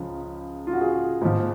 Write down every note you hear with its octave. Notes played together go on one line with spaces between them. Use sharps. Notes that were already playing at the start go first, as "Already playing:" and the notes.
Already playing: C#2 C#3 F3
F4
F#4
G#4
G#2 F3